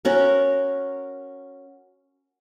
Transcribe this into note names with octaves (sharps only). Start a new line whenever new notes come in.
C#4 F#4 A#4